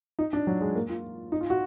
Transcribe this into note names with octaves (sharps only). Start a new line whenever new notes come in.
D#4
D4
F#3
G#3
A#3
F4
D#4
F4
F#4